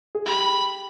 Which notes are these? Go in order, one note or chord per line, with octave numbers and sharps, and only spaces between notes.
G#4
G4 B5